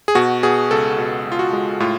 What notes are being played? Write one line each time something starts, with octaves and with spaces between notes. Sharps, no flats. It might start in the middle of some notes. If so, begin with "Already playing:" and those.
G#4
B2 F#4
B2 G#4
C#2 A4
B2
C#2
F4
F#4
G#3
A2 F4